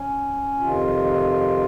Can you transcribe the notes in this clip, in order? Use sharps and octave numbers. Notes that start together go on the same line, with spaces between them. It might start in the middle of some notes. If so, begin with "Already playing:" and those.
Already playing: C#4
F2 C3 D#3 F4